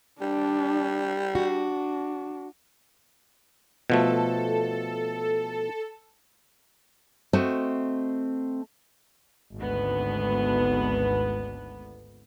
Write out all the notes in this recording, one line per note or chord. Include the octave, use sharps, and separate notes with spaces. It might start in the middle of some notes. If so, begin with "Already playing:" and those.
G3 D4
D4 F#4
B2 F3 A3 A4
A3 C4 F#4 D#5
G#1 D2 B3